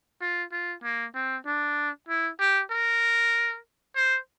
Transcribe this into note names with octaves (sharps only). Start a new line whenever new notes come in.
F4
F4
A#3
C4
D4
E4
G4
A#4
C5